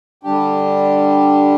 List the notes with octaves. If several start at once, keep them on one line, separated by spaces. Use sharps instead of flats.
D3 G3 D4 G4